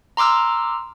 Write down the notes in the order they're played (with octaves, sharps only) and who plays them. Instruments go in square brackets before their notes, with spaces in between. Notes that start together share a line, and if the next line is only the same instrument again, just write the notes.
[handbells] A#5 C6 D6 E6 F6